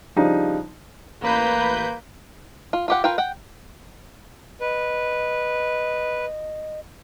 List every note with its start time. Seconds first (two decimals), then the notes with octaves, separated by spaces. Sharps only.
0.16 C#3 F3 G3 D4 D#4
1.22 A1 A#3 B4 G6
2.73 F4
2.88 F4 G4 F#5
3.04 F4 A#4 B4 G5
3.18 F#5 G5
4.61 B4 D#5